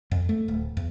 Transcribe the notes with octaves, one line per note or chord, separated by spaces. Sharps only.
F2
A3
D1
E2